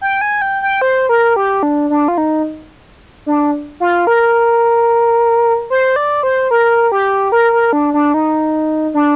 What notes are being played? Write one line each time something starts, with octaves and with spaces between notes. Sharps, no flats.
G5
G#5
G5
G5
C5
A#4
G4
D4
D4
F4
D#4
D4
F4
A#4
C5
D5
C5
A#4
G4
A#4
A#4
D4
D4
D#4
D4